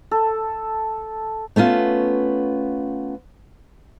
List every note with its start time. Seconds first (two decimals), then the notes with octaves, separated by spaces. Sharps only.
0.11 A4
1.56 A3 B3 C#4 F4